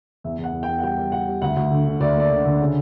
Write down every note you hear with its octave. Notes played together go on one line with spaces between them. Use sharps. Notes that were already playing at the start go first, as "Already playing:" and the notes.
E2 E5
E2
F#5
E2
G5
E2
F#5
G3 G5
G3
G3 F#5
G3
D2 F#5
D2
D3
D3
D2 D5
A#3 D5
D3
D3
C#3